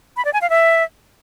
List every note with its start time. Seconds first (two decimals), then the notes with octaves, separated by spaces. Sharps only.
0.17 B5
0.25 D5
0.33 G#5
0.42 F5
0.50 E5